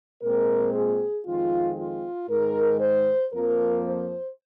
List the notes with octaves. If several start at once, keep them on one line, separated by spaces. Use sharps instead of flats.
A#2 G#3 C4 A#4
G#4
F2 D#3 G#3 C4 F4
F4
G#2 D#3 G#3 A#4
C5
F2 F3 A#3 A#4
C5